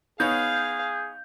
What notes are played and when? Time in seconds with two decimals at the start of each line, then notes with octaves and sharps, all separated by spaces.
0.20 B3 D#4 G#4 C#5 F5 G6